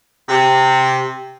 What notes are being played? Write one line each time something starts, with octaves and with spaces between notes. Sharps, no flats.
C3